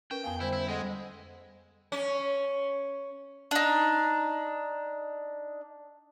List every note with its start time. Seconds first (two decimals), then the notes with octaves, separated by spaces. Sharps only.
0.11 C#4 A#4 B4 G5
0.24 F2 B3 F5 G#5
0.40 D3 G3 E4 C5
0.53 E4
0.68 G3 G#3 A4 D#5 F#5
1.92 C#4
3.51 D4 D#4